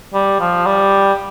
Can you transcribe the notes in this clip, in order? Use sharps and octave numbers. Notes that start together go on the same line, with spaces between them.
G3
F3
G3